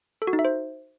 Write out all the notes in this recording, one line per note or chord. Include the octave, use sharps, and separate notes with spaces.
A4
F#4
D#4
E5
C5